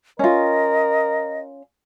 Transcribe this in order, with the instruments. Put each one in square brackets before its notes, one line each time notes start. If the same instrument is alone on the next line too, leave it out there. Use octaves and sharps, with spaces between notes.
[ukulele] C#4 F4 [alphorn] A#4 [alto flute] D#5